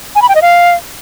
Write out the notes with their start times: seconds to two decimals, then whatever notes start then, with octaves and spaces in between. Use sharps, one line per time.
0.15 G#5
0.22 B5
0.29 G5
0.35 D#5
0.42 F5